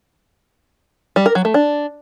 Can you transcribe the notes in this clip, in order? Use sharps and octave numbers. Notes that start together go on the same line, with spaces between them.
G3
A#4
F#3
A3
D4